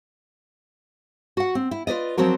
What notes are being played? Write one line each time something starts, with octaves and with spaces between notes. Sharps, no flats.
F#4 F#5
C4
E4
F4 B4 D5 D#5
F3 F#3 C4 F#4 A#4